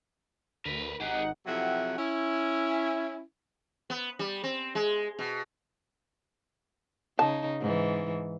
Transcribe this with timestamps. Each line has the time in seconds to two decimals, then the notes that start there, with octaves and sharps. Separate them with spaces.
0.65 D2 A#4 B4
1.01 G#1 D#4 G4 G#4 F#5
1.46 F2 C3 F#3 E4 E5 F#5
1.98 C#4 E4
3.90 B3
4.19 G3
4.44 C4
4.75 G#3
5.19 B2
7.19 C#3 D#4 A5
7.61 G#2 E3